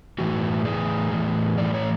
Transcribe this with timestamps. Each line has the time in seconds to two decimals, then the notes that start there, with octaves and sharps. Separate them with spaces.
0.18 A2 E3 F#4
0.65 A2 E3 G#4
1.11 A2 E3
1.58 A2 E3 D5
1.74 C#5